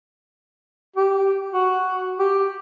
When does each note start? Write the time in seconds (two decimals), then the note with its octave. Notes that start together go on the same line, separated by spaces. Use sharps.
0.96 G4
1.53 F#4
2.19 G4